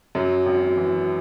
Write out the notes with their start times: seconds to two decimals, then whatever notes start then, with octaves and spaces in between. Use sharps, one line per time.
0.15 F#2 F#3
0.46 G#1
0.77 E3